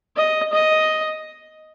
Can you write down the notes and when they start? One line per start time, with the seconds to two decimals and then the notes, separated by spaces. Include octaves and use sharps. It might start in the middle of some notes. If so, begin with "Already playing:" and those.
0.16 D#5
0.52 D#5